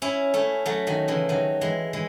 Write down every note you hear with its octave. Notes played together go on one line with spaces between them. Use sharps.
C#4 E4
A3 C#4
F#3 A3
D#3 F#3
C#3 E3
D#3 F#3
E3 G#3
E3 G#3